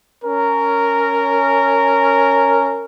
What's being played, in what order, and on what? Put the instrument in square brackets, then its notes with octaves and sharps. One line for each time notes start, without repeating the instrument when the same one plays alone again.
[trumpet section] C#4 A#4